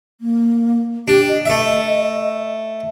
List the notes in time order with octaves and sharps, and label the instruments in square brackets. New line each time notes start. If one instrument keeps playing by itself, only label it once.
[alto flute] A#3
[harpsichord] D4 [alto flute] G4
[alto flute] D#5
[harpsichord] A3 E5